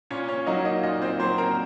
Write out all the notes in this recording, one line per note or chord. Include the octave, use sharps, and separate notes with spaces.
A#2 C#4 C#5
C#4 C#5
F#3 A#3 D#4 D#5
D#4 D#5
A#2 D#4 D#5
C4 C5
F#3 A#3 C4 C5
A#4 A#5